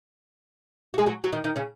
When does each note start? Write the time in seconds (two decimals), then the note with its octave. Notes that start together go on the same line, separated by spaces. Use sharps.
0.94 F#4
0.98 G#3 G#4
1.06 F#3 F#4
1.24 F#3 F#4
1.33 D#3 D#4
1.44 D#3 D#4
1.56 C#3 C#4